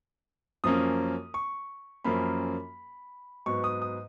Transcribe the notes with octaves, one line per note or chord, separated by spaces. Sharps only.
F#2 F3 A#3 C#4 D#6
C#6
F#2 F3 A#3 C#4 B5
G#2 F#3 B3 C#6
D#6
D#6